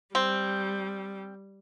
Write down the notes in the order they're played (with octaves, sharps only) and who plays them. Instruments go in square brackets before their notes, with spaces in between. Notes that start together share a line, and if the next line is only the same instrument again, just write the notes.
[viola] G3 [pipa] C4